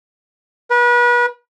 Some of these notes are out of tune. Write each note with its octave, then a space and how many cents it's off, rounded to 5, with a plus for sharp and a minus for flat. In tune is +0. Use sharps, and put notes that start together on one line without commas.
B4 -35